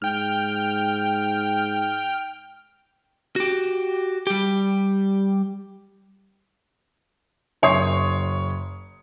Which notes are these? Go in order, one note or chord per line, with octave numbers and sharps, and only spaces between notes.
G#2 G5 F6
F#4 G4
G3 G4
F#1 C#5 C6 D#6 C7